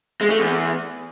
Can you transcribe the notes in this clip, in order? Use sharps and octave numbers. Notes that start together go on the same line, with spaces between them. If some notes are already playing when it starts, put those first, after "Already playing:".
G#3
A3
E2